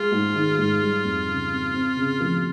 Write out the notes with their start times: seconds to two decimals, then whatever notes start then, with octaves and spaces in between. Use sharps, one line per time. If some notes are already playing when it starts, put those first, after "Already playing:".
Already playing: G#3 F4
0.11 G#2
0.34 D#3
0.58 G#2
0.81 G3
1.04 F2
1.28 C#3
1.50 C4
1.73 C4
1.97 C#3
2.20 F3